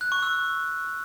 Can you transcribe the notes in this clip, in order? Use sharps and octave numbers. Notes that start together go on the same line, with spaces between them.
F#6
C#6
E6